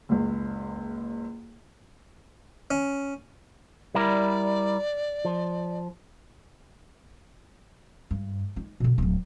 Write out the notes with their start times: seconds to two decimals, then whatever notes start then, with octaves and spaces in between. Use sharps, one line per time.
0.09 F#1 C#2
2.71 C#4
3.95 G3 E4 A#4 D5
5.25 F3
8.11 G2
8.56 D#4
8.80 B2 D3
8.98 D1 F#3